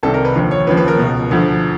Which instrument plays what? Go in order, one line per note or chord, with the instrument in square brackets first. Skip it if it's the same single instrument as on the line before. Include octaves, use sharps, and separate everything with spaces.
[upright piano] C2 C3 D#3 A4
A#4
B4
D#2 D3 F3
C#5
D#2 C#3 F3 B4
B4
A#4
C#2 B2
D2 D3 F3